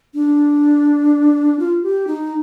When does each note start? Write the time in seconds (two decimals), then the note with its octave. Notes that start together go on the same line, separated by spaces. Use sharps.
0.14 D4
1.59 F4
1.83 G4
2.07 D#4